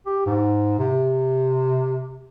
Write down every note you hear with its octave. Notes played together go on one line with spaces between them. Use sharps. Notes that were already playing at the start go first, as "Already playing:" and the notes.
G4
G#2
C3